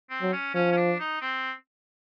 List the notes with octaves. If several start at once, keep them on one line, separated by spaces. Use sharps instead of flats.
C4
F#3
C#4
F3 C#4
C#4
D4
D#4
C4